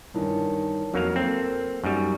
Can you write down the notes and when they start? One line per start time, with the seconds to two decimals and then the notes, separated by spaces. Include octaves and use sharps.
0.14 G2 D#3 E3 A#4 C#5 A5
0.94 F2 F#3 A#3 F5
1.16 A#3 C4 A4 A#4
1.84 F#2 G3 D#4 C#6